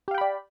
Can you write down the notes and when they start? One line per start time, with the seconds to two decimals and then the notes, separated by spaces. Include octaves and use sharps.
0.08 G4
0.11 F5
0.15 G5
0.18 B5
0.21 D5